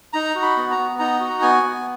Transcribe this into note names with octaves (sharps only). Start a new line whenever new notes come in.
D#4 A#5
F#4
B5
B3
A#5
B3
D#4 A#5
F#4
B3 G#5
B3